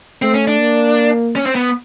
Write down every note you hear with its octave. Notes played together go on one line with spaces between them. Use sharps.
A3 C4
C#4
D4
A#3
C#4
C4
B3